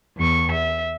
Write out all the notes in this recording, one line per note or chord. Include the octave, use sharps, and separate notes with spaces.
E2 C#6
E5